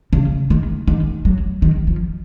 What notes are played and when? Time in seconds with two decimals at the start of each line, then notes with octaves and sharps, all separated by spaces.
0.13 C#3
0.50 D#3
0.88 D#3
1.25 F#3
1.62 D#3
1.87 F3